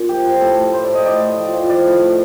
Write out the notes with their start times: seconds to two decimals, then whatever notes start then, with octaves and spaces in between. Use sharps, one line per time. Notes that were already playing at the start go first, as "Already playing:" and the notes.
Already playing: A#2
0.09 F3 G4
0.25 F3
0.41 A2 A4
0.57 A2
0.73 A2 C5
0.84 D5
0.89 A2
0.95 D#5
1.05 A2 D5
1.22 A2
1.38 F3
1.53 F3
1.70 F3 D5
1.86 A2